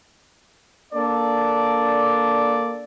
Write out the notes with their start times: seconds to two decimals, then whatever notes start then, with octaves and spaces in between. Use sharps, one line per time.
0.93 A#3 D4 A4 D5